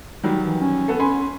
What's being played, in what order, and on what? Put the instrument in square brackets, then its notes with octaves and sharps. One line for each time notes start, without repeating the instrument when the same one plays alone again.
[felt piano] D#3 F#3 G3
[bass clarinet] E3
C#4
[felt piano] B3 A4
[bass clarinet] C#4 [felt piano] G#5 B5 C6